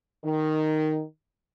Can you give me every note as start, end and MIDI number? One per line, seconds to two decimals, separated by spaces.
0.25 1.02 51